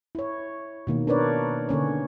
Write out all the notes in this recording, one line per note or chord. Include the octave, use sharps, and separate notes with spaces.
E4 C#5
B2 D#3 A#3
D4 A#4 B4 C#5 D5
D3 A#3 C#4 C#5